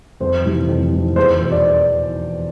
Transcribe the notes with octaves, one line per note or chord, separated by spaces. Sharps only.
F2 C5
C3 E3
F2
C3 E3
E2 C5
B2
D5